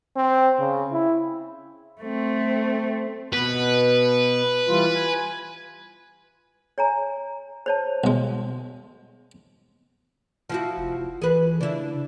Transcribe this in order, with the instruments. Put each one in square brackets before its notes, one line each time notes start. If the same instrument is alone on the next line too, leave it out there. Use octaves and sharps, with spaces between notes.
[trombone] C4
C#3
E4
[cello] A3 C4
[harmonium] B2 B3 [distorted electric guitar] B4
[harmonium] E3 G3 F4
G#5
[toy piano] C#5 G#5 A#5
C5 C#5 A5
[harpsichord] B1 G#3
[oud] F3 E4 F#4
[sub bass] F1
[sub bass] E3 [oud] G#4 B4
[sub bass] C#3 [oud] D4 E4